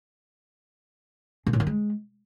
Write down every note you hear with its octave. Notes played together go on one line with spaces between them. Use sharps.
G#2
A2
D#3
G#3